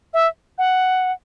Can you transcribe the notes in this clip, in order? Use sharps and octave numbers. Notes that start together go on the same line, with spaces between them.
E5
F#5